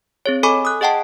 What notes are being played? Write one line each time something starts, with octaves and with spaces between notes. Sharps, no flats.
C4 G#4 C#5
A4 D#5 G#5 B5 C#6 D6
D#6 F#6
G#4 D#5 F#5 G5 A5